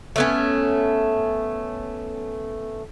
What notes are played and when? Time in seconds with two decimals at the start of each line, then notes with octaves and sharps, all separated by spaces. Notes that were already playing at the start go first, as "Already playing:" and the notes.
0.16 A3 B3 C#4